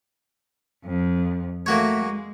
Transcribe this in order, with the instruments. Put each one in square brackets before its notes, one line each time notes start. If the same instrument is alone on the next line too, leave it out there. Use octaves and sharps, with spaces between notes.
[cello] F2
[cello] A3 [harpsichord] A#3 F#4 C#5
[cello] G#3